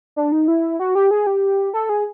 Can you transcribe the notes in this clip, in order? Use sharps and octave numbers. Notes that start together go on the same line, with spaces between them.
D4
D#4
E4
F#4
G4
G#4
G4
A4
G#4